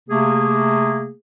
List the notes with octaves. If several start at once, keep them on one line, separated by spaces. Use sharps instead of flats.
C3 A3 A#3 G#4